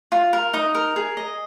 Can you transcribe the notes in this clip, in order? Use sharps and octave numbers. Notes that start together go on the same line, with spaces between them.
F4
A#4
D#4 D#6
A#4
G#4
D#5